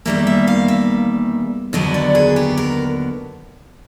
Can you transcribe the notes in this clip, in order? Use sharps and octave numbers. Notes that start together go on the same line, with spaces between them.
E2 C3 D#3 G3 A#3 E5
E5
F5
E5
D#2 D3 F#3 B3 D#5
D5
G#4
G4
A#4